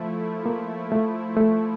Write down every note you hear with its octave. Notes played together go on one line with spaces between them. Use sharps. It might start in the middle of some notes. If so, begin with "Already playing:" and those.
Already playing: F3 A3 E4
A#3
A3
A3